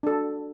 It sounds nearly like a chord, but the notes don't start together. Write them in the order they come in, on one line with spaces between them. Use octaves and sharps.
D4 A4 F#4